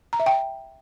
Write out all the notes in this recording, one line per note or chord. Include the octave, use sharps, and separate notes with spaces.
A#5
E5
G5